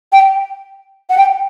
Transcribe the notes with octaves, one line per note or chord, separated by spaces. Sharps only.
G5
F#5
G5